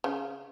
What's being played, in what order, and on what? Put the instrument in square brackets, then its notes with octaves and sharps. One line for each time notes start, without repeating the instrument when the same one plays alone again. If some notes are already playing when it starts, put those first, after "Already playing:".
[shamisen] C#3